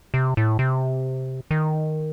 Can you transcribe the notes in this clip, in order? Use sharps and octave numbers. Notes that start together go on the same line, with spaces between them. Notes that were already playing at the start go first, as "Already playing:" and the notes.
C3
A2
C3
D#3